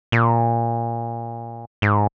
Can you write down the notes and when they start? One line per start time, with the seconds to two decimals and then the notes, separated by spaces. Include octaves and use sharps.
0.12 A#2
1.82 G#2